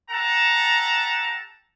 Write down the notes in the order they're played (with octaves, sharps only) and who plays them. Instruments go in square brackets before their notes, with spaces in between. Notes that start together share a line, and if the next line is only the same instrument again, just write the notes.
[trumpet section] G4 A4 F#5 A5 A#5